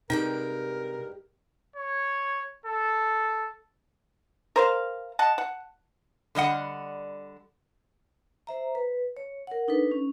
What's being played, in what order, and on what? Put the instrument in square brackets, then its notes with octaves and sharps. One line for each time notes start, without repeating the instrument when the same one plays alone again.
[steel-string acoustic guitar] G2 G#3 G5 [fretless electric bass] C3 [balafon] D#4 [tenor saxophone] A#4
[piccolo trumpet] C#5
A4
[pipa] A#4 C5 F5
D#5 F#5 A5
F#5
[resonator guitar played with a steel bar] D3 G3 D#5 F#5
[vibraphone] C5 E5 A#5
B4
C#5
A#4 F#5
D4 D#4 A4 B4
C#4